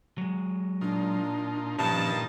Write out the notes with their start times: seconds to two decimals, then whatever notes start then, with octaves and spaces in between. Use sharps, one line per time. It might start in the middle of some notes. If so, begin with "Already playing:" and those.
0.18 F#3 G#3
0.81 A#2 D4 D#4 F4
1.79 G2 A#2 D#3 F3 C#4 D#5 A5